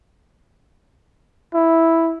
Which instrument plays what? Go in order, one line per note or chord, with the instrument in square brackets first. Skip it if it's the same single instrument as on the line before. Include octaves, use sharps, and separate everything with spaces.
[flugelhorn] E4